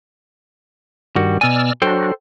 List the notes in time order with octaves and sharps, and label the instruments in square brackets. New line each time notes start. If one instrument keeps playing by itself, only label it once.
[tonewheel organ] G2 D#3 [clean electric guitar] G3 F#4
[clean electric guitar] B2 G#5 [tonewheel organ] D5 E6 F6
[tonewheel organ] F#3 D4 F#4 [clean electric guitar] A4 C5 G5